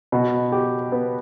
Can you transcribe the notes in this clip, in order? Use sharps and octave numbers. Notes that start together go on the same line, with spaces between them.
B2
G4
B3